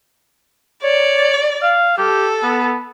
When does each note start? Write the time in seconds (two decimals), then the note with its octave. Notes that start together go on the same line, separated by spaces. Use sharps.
0.83 C#5 D5
1.62 F5
1.98 G4 A4
2.43 B3